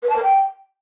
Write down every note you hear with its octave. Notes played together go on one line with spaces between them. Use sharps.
B4
A5
A#4
G5